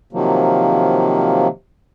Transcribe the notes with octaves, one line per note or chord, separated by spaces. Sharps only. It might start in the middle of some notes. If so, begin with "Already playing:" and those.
C3 D#3 F3 F#3 A#3